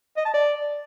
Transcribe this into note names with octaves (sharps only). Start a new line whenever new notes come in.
D#5
A5
D5